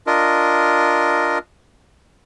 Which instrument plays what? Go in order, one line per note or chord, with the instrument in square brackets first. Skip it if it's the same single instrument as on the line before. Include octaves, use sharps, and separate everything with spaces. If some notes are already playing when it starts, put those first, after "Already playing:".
[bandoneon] D4 F4 A#4 D#5